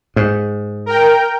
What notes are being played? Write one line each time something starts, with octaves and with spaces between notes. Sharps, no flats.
G#2
A#4 G5